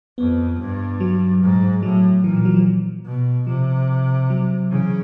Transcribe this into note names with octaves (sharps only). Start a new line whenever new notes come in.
F2 B3
G2
F#3
G#2
A2 F#3
A#2 E3
F3
F#3
F3
B2
C3 F3
F#3
C#3 E3